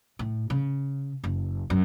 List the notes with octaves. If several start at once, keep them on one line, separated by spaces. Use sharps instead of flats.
A2
C#3
F#1
F#2